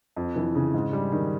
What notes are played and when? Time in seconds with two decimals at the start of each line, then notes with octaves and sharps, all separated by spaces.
0.17 F2
0.36 E3
0.55 C#3
0.74 G#2
0.93 G3
1.12 D#3